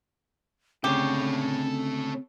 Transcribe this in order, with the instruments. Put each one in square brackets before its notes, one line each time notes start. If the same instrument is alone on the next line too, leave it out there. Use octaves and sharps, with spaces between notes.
[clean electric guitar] D2 C#3 [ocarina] C4 [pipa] G4 [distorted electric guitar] A4 C#5